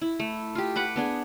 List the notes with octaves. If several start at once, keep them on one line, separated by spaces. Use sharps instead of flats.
E4
A3
F4 G4
B4 F#5 D6
B3 D4 G#4